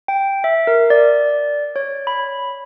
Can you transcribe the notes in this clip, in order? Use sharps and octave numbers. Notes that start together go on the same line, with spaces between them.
G5
E5
A#4
D5
C#5
B5